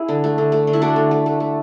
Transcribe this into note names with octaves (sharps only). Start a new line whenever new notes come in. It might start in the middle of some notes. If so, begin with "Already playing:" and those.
Already playing: E4 G#4
D3
A3
D3
A3
D3
E4
A3 D4 F#4
D3
A3
A3
A3